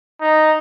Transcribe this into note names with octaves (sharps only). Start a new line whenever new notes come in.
D#4